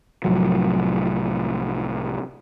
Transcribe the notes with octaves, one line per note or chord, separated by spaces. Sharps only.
C2 A2 F3 F#3